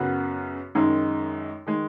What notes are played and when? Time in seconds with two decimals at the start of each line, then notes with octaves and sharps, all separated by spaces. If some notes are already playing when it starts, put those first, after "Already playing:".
Already playing: F#2 C#3 B3 F#4 B4
0.75 F#2 D#3 G#3 D#4
1.67 D#3 G#3